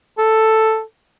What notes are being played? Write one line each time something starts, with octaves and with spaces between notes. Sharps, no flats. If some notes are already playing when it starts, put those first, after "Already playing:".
A4